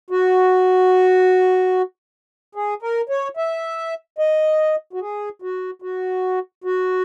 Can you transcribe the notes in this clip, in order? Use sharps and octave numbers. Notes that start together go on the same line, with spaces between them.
F#4
G#4
A#4
C#5
E5
D#5
F#4
G#4
F#4
F#4
F#4